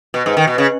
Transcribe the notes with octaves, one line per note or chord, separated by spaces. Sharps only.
B2
G#2
D#3
B2
C#3